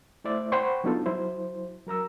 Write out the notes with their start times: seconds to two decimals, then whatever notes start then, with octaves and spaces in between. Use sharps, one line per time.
0.24 A3 E4 C5 D5 E5
0.52 C5 F#5 G5 B5 C#6
0.84 F#3 B3 D4 D#4 F4 A4
1.06 F#3 E4 C5
1.87 F#3 A#4 A#5 E6